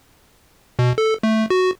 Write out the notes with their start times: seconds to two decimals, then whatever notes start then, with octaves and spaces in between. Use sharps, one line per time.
0.79 B2
0.98 A4
1.23 A3
1.50 F#4